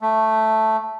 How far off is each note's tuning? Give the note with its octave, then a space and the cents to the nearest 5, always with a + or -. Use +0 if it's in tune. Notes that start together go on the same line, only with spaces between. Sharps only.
A3 +0